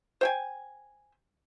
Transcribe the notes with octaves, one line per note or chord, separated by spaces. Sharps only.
C5 G5 G#5